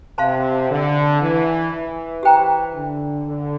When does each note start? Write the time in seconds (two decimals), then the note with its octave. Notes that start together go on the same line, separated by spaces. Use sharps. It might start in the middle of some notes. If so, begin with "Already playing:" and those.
0.18 C3 C5 F5 A5 C6
0.70 D3
1.22 E3
1.72 E3
2.23 G4 C5 G5 A#5
2.74 D3
3.26 D3